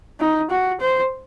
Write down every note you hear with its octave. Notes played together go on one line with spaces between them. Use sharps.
D#4
F#4
C5